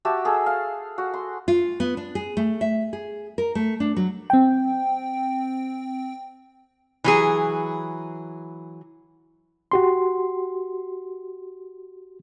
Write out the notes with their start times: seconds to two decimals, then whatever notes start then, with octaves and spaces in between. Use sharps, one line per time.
0.05 F#4 G4 E5 A5
0.25 G#4 A4
0.46 F5
0.98 F#4
1.14 C6
1.48 F4
1.80 B3
1.97 D4
2.15 G#4
2.37 A3
2.61 E5
2.93 G#4
3.38 A#4
3.55 A3
3.80 D4
3.96 F#3
4.30 C4 G5
7.04 E3 F#3 G#4
9.72 F#4 G4 C6